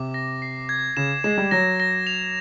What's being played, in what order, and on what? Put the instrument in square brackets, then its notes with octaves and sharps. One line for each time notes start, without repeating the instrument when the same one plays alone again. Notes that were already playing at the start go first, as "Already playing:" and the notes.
Already playing: [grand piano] C3 [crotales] D6
[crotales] A#6
C7
G#6
[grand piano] C#3 [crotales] E7
[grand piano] G#3 [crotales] E7
[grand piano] G3
[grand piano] F#3 [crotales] A#6
[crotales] A#6
F7